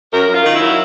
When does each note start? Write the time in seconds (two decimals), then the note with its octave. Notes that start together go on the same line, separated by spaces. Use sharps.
0.12 F#2 A#4
0.28 F#2
0.33 F4
0.44 D#3
0.55 E4
0.61 F#3